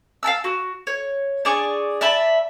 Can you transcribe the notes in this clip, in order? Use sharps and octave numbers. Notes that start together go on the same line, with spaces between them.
F5 G5 A5 E6
F#4
C#5
D4 G#4 D5 C#6
D5 E5 A5 B5